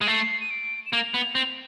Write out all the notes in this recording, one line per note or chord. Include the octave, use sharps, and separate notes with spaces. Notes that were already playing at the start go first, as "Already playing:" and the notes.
G#3
A3 C7
D#7
D7
E7
A#3 F7
B3
C4